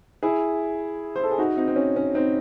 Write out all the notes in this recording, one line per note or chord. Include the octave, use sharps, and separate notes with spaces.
E4 G#4
C5
A4
G#4
D#4 F#4
C4 D#4
C4
C#4
C#4
C4 D#4